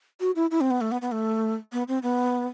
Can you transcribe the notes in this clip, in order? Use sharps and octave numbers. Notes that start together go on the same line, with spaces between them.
F#4
E4
E4
C4
B3
A3
B3
B3
A3
B3
C4
B3